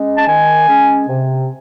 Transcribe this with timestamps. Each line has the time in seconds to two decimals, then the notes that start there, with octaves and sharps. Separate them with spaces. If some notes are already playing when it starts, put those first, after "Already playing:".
Already playing: G#3 C#4
0.17 A5
0.27 D#3 G#5
0.67 G#3 C#4
1.08 C3